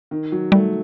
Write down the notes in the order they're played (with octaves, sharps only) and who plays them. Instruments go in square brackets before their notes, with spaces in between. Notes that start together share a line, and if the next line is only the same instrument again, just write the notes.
[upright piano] D#3
F#3
[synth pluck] G3 [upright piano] A3